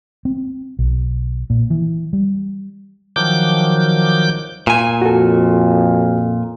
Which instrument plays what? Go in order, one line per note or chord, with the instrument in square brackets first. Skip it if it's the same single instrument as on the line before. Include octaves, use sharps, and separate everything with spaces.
[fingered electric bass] C4
B1
A#2
E3
G3
[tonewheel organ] D#3 F3 F#3 D6 G6
[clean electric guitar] A#2 G#5
[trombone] F2 [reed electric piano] F#4 A4